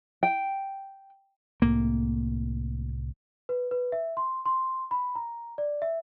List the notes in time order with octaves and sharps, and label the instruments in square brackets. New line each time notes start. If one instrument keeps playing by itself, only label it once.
[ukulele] G5
[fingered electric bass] C2 A2 [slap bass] A#3
[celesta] B4
B4
E5
C6
C6
B5
A#5
D5
E5